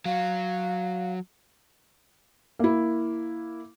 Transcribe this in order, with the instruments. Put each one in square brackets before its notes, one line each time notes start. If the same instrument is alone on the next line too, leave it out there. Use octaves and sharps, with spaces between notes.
[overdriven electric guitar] F#3 [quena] F5
[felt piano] A#3 E4